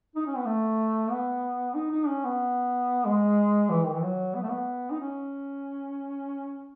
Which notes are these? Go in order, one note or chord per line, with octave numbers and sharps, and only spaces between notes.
D#4
C#4
B3
A3
B3
D#4
D#4
C#4
B3
G#3
E3
D#3
E3
F#3
B3
A3
B3
D#4
C#4